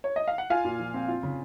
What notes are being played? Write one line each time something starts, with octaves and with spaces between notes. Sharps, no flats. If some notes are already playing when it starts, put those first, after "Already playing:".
C#5
D#5
F5
F#5
F4 F5 G#5
A#2
F3
C4
F4
C#3